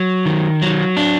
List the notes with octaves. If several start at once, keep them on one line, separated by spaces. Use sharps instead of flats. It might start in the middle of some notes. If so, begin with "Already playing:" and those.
Already playing: F#3
D#3
F#3
D4